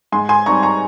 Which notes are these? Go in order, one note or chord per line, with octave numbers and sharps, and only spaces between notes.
G#2 G#5 C6
G#5 C6
G3 C4 D#4 A#5 C#6
A#5 C#6